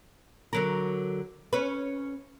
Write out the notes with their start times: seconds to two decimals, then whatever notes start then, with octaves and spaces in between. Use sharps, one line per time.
0.53 D3 F#3 A#4
1.53 C#4 B4